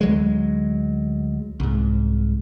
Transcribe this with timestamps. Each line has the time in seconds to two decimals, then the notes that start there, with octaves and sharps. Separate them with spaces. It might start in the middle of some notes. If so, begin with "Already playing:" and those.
0.01 D2 F#3 G#3
1.60 C2 G#2